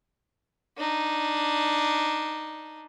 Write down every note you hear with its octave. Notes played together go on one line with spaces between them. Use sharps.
D4 D#4